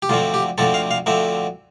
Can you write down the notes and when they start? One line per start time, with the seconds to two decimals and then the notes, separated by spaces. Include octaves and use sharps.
0.02 G4
0.09 D2 D3 F3 C4 F4
0.34 G4
0.58 D2 D3 F3 C4 A4
0.74 F5
0.91 F5
1.06 D2 D3 F3 C4 E5